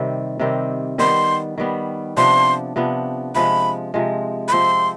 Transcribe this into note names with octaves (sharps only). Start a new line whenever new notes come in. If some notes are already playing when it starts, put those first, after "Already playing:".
Already playing: C3 D#3 G3 C4
C3 D#3 G3 C4
D#3 G3 B3 C6
D#3 G3 B3
C3 F3 B3 D4 C6
C3 F3 B3 D4
C3 F3 G#3 B5
C3 F3 G#3
B5
C3 F3 C4 C6